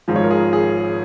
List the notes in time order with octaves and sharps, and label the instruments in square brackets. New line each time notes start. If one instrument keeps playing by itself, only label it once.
[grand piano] G#1 G#2 F3
C#5
A#4
G#4
G#4